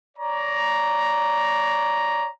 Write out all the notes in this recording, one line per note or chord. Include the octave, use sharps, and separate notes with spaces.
C#5 D5 A#5